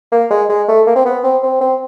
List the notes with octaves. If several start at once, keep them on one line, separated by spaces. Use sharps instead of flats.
A#3
G#3
G#3
A3
A#3
C4
B3
C4
C4
C4